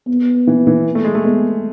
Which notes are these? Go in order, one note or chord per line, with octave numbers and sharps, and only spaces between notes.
B3
E3
E3
A3
G#3
A3
G#3 B3